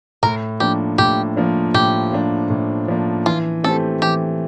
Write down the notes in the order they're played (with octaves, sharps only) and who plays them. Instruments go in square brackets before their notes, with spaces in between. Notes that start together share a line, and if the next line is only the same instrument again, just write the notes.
[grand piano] A2 [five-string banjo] A#4
[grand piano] F3 A#3 D4 [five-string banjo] G4
[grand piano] A2 [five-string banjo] G4
[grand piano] F3 A#3 D4
[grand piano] A2 [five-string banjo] G4
[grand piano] F3 A#3 D4
A2
F3 A#3 D4
[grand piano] E3 [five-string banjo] F4
[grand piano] A3 C4 G4 [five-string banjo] A4
[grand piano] E3 [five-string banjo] G4